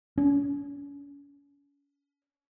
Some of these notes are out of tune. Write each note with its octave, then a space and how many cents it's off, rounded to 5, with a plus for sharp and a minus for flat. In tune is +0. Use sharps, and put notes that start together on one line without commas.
C#4 +40